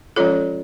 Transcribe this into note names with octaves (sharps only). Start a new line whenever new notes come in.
F3 G#3 C#4 F4 A4 C#5